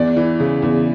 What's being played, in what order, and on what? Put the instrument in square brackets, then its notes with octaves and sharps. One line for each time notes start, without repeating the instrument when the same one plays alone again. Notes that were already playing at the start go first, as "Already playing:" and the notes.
Already playing: [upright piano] E2 D5
E3
C#3
E2